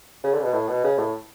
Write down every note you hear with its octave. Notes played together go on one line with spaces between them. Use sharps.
C#3
D3
C#3
B2
A2
B2
C#3
A2